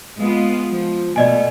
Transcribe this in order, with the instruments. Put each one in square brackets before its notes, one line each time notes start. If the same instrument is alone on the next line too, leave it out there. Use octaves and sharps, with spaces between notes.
[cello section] G#3 B3 F4
F3
[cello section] B2 A3 [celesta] D5 D#5 G#5